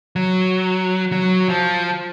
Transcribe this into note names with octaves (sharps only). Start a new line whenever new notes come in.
F#3
F#3
F3